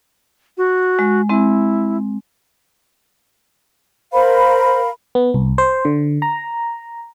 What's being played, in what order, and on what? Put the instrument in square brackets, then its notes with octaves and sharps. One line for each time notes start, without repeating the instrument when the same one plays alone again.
[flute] F#4
[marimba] G#3
[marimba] G#3 C4 [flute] E4
[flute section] A#4 F5 B5 [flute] C5
[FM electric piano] B3
C2
C5
D3
A#5